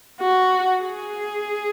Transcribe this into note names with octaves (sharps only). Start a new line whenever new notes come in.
F#4
G#4